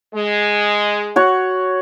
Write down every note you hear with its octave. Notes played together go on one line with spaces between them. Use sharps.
G#3
F#4 C#5 F#5